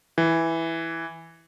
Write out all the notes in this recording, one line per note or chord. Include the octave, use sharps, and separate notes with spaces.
E3